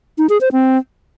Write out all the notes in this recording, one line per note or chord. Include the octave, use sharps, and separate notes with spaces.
D#4
G#4
C5
C4